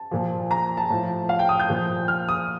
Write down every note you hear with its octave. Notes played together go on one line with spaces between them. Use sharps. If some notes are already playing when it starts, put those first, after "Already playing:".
Already playing: A5
A#2 F3
A#5
A5
A2 F3
F5
G5
D#6
G6
A#2 F3
F6
D#6